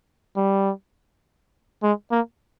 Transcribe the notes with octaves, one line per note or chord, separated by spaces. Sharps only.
G3
G#3
A#3